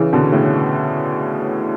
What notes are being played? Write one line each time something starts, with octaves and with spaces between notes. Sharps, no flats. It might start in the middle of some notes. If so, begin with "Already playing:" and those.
Already playing: C#3 E3
B2 D3
A2 C#3